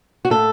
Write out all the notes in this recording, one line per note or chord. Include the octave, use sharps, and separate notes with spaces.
F#4
A2 A4